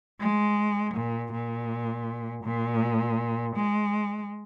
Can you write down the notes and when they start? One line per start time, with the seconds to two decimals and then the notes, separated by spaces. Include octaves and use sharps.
0.20 G#3
0.94 A#2
1.32 A#2
2.44 A#2
3.56 G#3